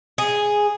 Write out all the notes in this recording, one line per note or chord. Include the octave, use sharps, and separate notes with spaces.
G#4